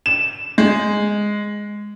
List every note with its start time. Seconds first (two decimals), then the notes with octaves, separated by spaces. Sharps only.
0.06 E7
0.58 G#3